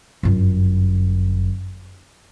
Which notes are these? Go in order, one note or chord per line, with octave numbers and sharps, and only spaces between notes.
G1 F#2